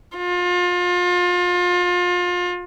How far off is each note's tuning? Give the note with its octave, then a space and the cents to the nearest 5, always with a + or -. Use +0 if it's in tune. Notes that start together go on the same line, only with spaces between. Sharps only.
F4 +30